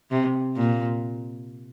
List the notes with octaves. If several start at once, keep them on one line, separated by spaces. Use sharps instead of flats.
C3
A#2